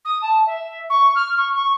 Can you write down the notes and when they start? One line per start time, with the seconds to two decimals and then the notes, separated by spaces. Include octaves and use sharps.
0.05 D#6
0.22 A5
0.46 E5
0.90 C#6
1.15 F6
1.37 C#6
1.55 C#6